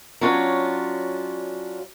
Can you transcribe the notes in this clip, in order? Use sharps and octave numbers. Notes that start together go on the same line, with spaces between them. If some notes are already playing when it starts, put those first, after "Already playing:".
F#3 C#4 D4 F4